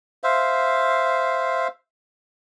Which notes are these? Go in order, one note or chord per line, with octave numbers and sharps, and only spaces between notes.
C5 E5 F5